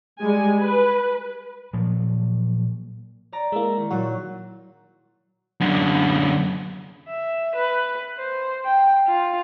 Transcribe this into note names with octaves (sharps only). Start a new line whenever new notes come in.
G3 G#3 G#5
B4
A#2 F3 F#3
D5 A#5
G#3 A#3 E4 E5
D#3
A#2 F#3 G3 F#4
F#2 D3
E5
B4
C5
G5
F4